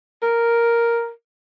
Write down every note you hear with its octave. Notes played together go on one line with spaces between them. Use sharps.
A#4